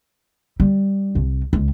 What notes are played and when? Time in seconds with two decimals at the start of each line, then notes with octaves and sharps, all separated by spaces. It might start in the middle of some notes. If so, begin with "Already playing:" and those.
0.60 G3
1.15 C2
1.53 C#2